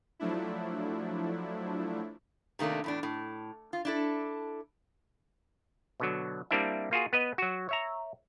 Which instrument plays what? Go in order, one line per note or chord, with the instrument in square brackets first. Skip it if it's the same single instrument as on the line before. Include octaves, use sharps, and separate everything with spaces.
[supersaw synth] F3 F#3 A3 D4 E4
[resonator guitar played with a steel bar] C3 D#3 A3 A#3 D4
E2 A2 D4
A2
F4
D4 E4 A4
[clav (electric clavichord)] B2 D3 F#3
G3 A#3 C4 D4 E4 E5
A#3 F4 F#4 G#4
B3 B4 D#5
F#3 F#4
C#5 E5 A#5